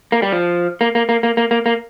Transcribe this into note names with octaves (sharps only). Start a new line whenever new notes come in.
A#3
G3
F3
A#3
A#3
A#3
A#3
A#3
A#3
A#3